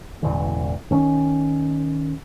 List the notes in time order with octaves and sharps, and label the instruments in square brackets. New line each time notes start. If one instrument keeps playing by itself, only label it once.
[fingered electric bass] E1 A1 D3 E3
D#3 C#4